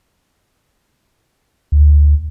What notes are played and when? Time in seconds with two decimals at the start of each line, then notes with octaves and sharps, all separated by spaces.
1.72 D2